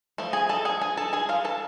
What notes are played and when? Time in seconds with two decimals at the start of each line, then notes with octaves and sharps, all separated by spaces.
0.18 F3 A3
0.33 G#4 G#5
0.49 A4 A5
0.65 G#4 G#5
0.81 G#4 G#5
0.97 A4 A5
1.13 G#4 G#5
1.29 F4 F5
1.45 A4 A5